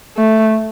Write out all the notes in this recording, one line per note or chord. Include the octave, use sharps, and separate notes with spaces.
A3